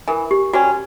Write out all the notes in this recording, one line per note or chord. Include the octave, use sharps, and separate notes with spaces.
E3 A#4
G4
G3 C#4 F#4